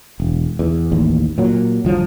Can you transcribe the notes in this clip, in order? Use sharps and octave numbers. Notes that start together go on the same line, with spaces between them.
E1
E2
A1 D#2
A#2 F#3
G1 F3 F#3